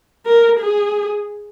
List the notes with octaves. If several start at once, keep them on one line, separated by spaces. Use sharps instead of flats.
A#4
G#4